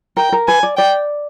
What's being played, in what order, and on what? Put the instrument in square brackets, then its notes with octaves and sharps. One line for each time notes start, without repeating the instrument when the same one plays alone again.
[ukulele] A#4 [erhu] G5
[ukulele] A#4
[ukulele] B4 [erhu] G#5
[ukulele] D5
[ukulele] D5 [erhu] G5